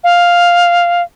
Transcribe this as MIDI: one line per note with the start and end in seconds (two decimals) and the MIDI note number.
0.04 1.02 77